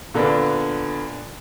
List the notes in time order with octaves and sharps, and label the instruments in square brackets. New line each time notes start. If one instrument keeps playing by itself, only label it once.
[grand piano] A#2 D3 A#3 B3 D4